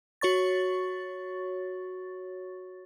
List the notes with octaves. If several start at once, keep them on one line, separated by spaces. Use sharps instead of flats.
F#4 C#5 C#6 A6